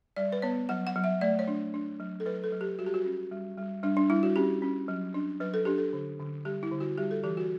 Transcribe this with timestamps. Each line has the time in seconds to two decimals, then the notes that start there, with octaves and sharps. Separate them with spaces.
0.16 G3 D5
0.32 B4
0.42 B3 C#5
0.69 F#3 F#5
0.87 F#5
0.96 F#3
1.04 E5
1.21 A3 D5
1.39 C#5
1.48 D4
1.74 D4
2.00 F#3
2.20 A4
2.26 F#3 B4
2.44 A4
2.53 F#3
2.61 G4
2.79 G3 F#4
2.86 G4
2.94 F#4
3.05 C#4
3.31 G3
3.57 G3
3.83 G3 D4
3.97 D4
4.10 G3 E4
4.23 F#4
4.36 C#4 G4
4.62 C#4
4.88 F#3
5.14 D4
5.40 F#3 B4
5.54 A4
5.65 D4 G4
5.78 A4
5.93 D3
6.19 D3
6.45 G3 G4
6.63 E4
6.72 D3
6.80 F#4
6.98 G3 G4
7.11 A4
7.24 E3 G4
7.37 F#4